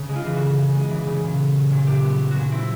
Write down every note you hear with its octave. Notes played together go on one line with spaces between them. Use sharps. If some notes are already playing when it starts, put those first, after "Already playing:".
Already playing: C#3
G#3
F4
E3
F#4
C#3
C#3
G#3
E3
C#3
A#2
B3
F#3
A#2
A#2 G4
B3
F#3
F#4
A#2
C4 E4